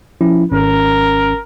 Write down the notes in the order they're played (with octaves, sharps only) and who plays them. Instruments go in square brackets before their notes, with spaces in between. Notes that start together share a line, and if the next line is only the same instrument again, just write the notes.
[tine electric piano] F3 C#4 E4
[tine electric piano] G#1 C#4 [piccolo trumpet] A#4